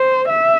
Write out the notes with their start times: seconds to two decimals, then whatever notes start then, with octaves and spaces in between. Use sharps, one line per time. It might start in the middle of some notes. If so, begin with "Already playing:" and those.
Already playing: C5
0.29 E5